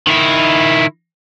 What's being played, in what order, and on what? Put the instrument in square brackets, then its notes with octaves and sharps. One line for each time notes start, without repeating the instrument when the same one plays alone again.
[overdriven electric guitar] D#3 E4